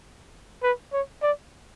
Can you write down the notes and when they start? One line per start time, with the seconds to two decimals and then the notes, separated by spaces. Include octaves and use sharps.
0.63 B4
0.93 C#5
1.22 D5